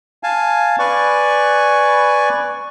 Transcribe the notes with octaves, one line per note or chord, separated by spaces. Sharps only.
F5 G#5 A5
B4 D5 G#5 C#6